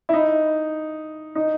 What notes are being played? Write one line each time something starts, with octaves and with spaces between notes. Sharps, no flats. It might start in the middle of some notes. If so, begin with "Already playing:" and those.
E4
D#4
D#4